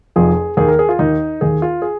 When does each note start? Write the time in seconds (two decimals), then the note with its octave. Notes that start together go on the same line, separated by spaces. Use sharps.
0.16 F1 F2 F3 G#4
0.57 D#2 D#3 G#4
0.68 A#4
0.79 G#4
0.89 F4
0.99 D#2 D#3 D#4
1.41 D#2 D#3 G#4
1.62 F4
1.82 G#4